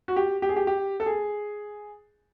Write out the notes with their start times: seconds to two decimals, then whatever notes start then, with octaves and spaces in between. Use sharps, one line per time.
0.08 F#4
0.16 G4
0.42 G4
0.49 G#4
0.56 G4
0.67 G4
1.00 A4
1.06 G#4